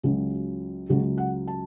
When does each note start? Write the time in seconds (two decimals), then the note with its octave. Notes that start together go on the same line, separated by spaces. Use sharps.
0.03 C#2 C#3 F#3 F#4
0.89 C#2 C#3 F#3 F#4
1.18 F#5
1.47 A5